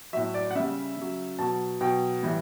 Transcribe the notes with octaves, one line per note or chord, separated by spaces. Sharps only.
A2 F#3 E5
D5
F#5
C#3 G3 E5
C#3 F#3
B2 F#3 A5
B2 F#3 G5
A2 E3 G3